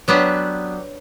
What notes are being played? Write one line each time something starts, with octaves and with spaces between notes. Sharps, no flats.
F#3 B3 D4 G4